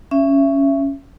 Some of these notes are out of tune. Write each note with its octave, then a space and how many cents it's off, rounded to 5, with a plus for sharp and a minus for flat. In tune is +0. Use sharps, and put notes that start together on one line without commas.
C#4 +0 E5 +25